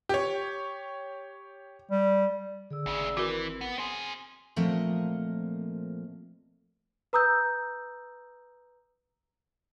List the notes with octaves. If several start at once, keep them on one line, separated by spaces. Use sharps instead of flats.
G4 C#5
G3
D3 G#4 D5 E6
G#1 D2 C#3
E3 C4 F#4 A#4
B3
C4 G#4 C6
A#2 F3 A3 C4 A#4 D#5
B4 A#5 D#6 E6 G6